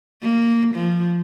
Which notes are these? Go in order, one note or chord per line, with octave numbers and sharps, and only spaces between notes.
A#3
F3